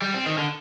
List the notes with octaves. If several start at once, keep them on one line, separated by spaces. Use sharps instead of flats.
G3
C4
D#3
D3